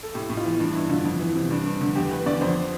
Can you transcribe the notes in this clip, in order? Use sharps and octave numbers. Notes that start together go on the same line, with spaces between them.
A4
A2 G4
A2
F4
E3
G2 D4
G2 E4
D3 F4
F2
E3
C3
G2 D4
G2
D3
E2 G4
E2 B4
D3 D5
F2 C5